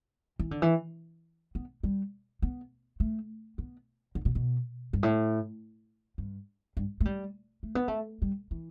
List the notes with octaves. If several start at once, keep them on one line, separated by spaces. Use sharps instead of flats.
E3
D3
E3
B3
G3
B3
A3
B3
D3
B2
B2
G2
A2
G2
G2
A3
G3
A3
B3
A3
G3
E3